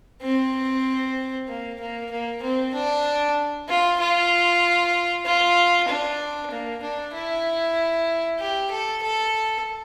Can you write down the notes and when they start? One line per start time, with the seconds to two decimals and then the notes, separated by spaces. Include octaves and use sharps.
0.22 C4
1.48 A#3
1.80 A#3
2.11 A#3
2.43 C4
2.74 D4
3.68 F4
4.00 F4
5.25 F4
5.88 D4
6.51 A#3
6.83 D4
7.14 E4
8.39 G4
8.71 A4
9.03 A4